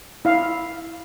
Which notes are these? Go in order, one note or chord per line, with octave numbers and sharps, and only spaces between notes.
E4 F5